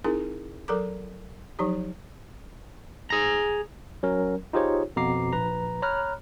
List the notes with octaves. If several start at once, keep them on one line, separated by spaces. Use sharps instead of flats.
C4 D#4 E4 G#4 A#4
F#3 A4 A#4 A#5 D6
F3 F#3 D#4 G4
G#4 A#5
F#3 C#4 A#4
D#4 F4 G4 G#4 C5 C#5
F2 B2 B3 A#5 D6 C7
A#1 B4 A#5
C#5 A#5 B5 F6 F#6